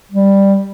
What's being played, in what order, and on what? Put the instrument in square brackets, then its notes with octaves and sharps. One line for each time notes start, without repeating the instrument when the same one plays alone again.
[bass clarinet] G3